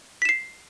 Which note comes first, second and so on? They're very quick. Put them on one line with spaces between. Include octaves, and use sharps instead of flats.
B6 E7 C7